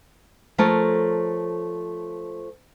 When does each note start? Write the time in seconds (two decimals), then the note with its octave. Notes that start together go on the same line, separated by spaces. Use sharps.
0.58 F3 A3 A4 A#4 C#5 A5